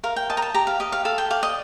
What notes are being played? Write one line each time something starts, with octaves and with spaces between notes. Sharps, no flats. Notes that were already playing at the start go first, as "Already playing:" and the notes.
A#4 F5
G5
D#5 A5
A#5
A5
G4 A#5
F5
G4 D#5
F5
A4 F5
G5
D5 F5
D#5